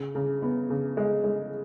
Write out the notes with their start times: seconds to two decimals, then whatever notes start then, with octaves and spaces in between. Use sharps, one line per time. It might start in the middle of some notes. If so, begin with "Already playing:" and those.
Already playing: C#3
0.15 C#3
0.42 B3
0.70 C#3
0.97 G#3
1.24 G#3